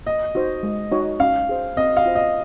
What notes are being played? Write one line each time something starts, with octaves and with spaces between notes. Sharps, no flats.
A#3 D#5
D#4 F#4 C5
G#3
D#4 F#4 C#5
C#4 F5
G#4 C5
C4 D#5
F5
F4 C5
D#5